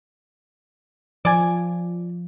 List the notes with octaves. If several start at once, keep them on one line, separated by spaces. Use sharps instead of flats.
F3 D5 G#5